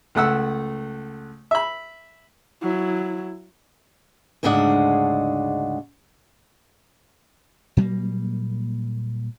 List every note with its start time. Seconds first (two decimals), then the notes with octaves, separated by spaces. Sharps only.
0.15 C#2 A3 F#5 E6
1.51 E5 B5
2.61 F#3 E4
4.43 D2 G#2 C#3 G#3 D4 F#5
7.77 A#2 F#3 G3 A#3